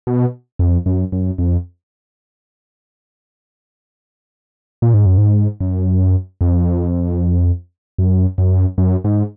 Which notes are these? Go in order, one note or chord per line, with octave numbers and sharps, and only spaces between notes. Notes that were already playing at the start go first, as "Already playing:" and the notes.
B2
F2
F#2
F#2
F2
A#2
G#2
F#2
G#2
F#2
F2
F#2
F#2
F#2
G#2